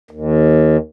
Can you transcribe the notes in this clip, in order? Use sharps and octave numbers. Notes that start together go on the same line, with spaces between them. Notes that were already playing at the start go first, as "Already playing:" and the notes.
D#2